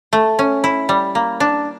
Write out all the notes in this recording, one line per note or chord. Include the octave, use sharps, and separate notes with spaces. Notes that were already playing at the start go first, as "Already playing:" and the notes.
A3
C#4
E4
G3
A#3
D4